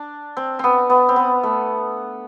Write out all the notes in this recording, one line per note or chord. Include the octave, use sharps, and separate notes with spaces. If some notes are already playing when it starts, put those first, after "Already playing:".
Already playing: D4
C4
B3 C4
B3
C4
B3
A3